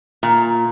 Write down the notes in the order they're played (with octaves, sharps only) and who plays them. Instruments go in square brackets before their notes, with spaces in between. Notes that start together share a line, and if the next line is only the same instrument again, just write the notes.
[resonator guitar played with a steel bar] A#2